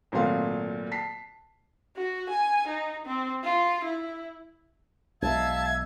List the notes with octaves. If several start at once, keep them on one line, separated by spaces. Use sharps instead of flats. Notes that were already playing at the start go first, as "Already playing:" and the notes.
G#1 A#2 F#3 A3 F5 C6
A5 B6 C7
F#4
G#5
D#4
C4
F4
E4
B1 G#3 E5 F5 A5 E6 G#6